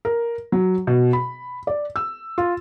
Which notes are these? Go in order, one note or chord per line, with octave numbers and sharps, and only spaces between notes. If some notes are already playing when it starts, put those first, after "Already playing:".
A#4
F#3
B2
B5
D5
E6
F4